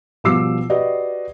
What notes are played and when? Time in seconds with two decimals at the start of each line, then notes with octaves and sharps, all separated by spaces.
0.24 B2 F3 G3 D6 E6 C7
0.70 F#4 G4 B4 D5 D#5